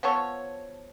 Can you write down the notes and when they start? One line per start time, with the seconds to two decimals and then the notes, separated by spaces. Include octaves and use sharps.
0.03 F3 B3 A4 C#5